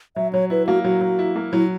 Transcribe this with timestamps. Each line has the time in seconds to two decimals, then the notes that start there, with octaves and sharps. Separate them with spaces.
0.16 F#3 E5
0.33 F#3 C#5
0.50 E4 B4
0.67 A#3 F#4
0.84 F#3 F#4
1.01 F#3
1.19 E4
1.36 A#3
1.52 F#3 E4